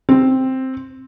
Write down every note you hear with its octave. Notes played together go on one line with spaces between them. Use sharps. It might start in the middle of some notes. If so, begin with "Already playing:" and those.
C4